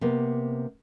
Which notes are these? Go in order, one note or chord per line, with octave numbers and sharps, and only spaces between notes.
C3 A#3 B3